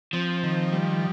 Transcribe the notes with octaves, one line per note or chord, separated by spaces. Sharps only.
F3 C4
D#3
G3